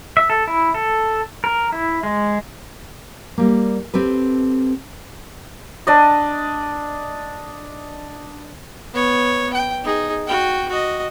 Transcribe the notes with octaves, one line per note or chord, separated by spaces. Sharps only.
E5
A4
E4
A4
A#4
E4
G#3
G3 A#3
C4 G4 A4 B4
D4 D5 D#5
B3 C#5
G5
D#4 G#4
F#4 G5
F#4 D#5